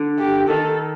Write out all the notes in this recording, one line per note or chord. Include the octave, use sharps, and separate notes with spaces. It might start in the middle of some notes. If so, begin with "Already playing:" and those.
Already playing: D3
G4
D#3 A4